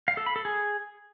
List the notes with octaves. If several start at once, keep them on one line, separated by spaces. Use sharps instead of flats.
F5
A4
B5
A4
G#4